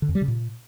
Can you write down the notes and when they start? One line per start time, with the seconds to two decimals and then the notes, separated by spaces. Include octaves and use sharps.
0.02 D3
0.09 F2
0.15 G3
0.22 C#3
0.28 A#2